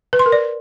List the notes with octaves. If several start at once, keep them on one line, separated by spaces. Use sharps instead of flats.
B4
C6
A#4
D5